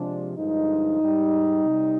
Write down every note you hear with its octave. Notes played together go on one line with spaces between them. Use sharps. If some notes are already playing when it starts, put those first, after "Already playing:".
Already playing: C3 F3 G#3 D4
G2 D3 F3 G#3 D#4
G#2 G3
C3 G3